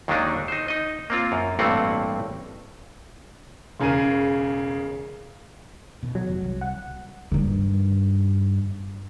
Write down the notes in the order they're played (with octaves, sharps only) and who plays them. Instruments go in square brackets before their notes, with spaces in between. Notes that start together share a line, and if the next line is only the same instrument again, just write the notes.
[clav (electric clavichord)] D#2 D#3 F#3 G#3 D4 D#4
D#4 C5
D#4 D#5
A#3 C4 F4
F#2
A1 G2 A3 A#3 C4 F#5
[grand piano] E1 C#3 G#4 A#4 D#7
[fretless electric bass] B2 D#3
[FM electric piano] F#3
[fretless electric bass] F1 D#3
C2
[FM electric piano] F#5
[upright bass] G2 D#3